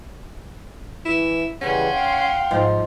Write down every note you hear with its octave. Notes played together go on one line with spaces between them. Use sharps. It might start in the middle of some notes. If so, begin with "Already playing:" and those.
E3 E4
C#3 E3 G3 C#4 F#5 C6
F5 G5
G#2 F3